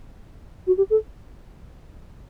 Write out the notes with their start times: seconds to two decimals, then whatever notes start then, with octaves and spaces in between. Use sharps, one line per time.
0.67 F#4
0.77 G4
0.90 A4